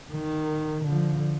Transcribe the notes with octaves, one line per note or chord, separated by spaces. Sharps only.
D#3
D3 F3